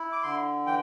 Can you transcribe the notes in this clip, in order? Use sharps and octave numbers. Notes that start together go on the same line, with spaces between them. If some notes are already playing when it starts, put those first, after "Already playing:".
Already playing: E4
D6
D3 C6
E3 G5